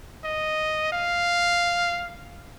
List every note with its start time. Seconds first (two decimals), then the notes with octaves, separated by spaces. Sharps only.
0.24 D#5
0.92 F5